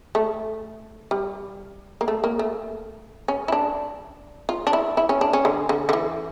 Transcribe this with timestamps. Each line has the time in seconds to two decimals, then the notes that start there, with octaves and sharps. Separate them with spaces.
0.15 A3
1.11 G3
2.01 A#3
2.08 A3
2.24 A#3
2.39 A3
3.28 C#4
3.48 E4
3.52 D4
4.49 F4
4.67 D4
4.73 E4
4.97 E4
5.09 C#4
5.21 D4
5.33 C#4
5.45 D3
5.69 D3
5.89 D3
5.93 E3